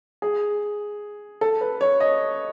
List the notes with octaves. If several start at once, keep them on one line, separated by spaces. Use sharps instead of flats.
G#4
A4
B4
C#5
D#5